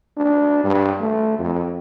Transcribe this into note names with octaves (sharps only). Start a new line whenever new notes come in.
D4
G2
A3
F2